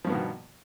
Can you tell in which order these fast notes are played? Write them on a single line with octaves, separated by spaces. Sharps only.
F3 G2 B3 D#3 B2